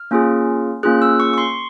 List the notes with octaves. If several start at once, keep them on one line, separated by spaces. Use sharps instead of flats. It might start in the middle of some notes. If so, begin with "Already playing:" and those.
Already playing: F6
A#3 C#4 F4 G#4
A#3 C#4 F4 G#4 F#6
E6
C#6
C#6
C6